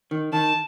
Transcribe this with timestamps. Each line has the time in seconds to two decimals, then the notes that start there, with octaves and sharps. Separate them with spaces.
0.11 D#3
0.33 D#3 A5